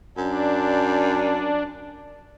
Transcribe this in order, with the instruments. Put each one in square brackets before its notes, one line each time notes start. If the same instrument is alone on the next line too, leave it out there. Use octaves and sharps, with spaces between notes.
[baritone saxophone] F#2 [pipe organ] D4